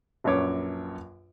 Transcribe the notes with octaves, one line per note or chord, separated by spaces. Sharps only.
A#1 F#2 B4 C#5 D6